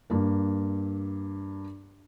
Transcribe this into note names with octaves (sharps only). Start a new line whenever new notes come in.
G2 A#3